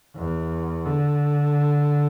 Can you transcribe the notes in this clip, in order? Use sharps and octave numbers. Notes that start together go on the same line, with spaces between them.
E2
D3